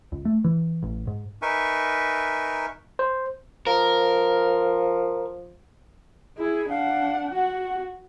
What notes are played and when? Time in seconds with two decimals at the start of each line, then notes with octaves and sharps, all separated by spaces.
0.12 C#2
0.25 A3
0.44 E3
0.82 A1
1.07 G#2
1.42 D#4 A#4 B4 E5 G#5 C#6
2.99 C5
3.66 F3 A#4
6.38 E4 G#4
6.69 D4 F5 F#5
7.35 F#4 F#5